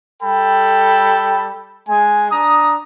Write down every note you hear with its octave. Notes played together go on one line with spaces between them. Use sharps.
G3 A4 G5 B5
G#3 G#5
D4 A#5 D#6